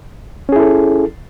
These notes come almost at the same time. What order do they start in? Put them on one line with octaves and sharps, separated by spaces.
C#4 G#4 E4 A4